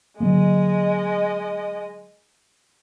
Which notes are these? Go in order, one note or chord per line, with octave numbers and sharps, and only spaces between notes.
D3 F#3 G#3 A#3 D#5